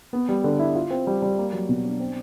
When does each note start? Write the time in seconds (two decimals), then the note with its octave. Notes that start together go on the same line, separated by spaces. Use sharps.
0.13 B3
0.29 G3
0.44 D3
0.59 E4
0.76 F4
0.90 C4
1.07 G3
1.22 G3
1.38 A#3
1.53 F#3
1.69 B2
1.85 D4
2.00 C4